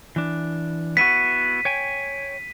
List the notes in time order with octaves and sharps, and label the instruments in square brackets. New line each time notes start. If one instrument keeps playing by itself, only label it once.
[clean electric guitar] E3 D4
[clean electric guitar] B3 E4 F#4 [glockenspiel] B6 D#7
[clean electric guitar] C#5 G5 G#5